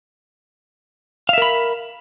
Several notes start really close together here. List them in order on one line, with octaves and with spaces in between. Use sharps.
F5 E5 A#4 B5